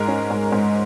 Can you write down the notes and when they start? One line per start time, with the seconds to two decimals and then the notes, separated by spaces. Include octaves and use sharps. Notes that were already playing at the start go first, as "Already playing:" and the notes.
Already playing: G#2 G#3 A#4
0.08 C#4
0.30 G#2
0.52 G#2